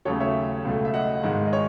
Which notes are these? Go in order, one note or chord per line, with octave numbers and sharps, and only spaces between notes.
D#2 C#3 F#3 A3 A4 C#5
C#5 E5
C#2 B2 F#3 A3
E5
D#5 F#5
G#2 D#3 G#3
D#5
C#5